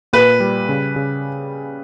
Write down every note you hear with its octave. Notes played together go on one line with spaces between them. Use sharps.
A#2 B4
G3
C#3
C#3